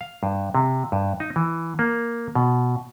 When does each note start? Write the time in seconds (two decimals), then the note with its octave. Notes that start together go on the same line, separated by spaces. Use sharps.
0.01 F5
0.23 G2
0.55 C3
0.92 G2
1.20 D#4
1.36 E3
1.79 A#3
2.35 B2